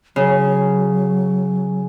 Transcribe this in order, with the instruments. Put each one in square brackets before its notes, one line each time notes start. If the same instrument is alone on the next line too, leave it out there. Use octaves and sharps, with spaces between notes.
[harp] C#3 [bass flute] F#3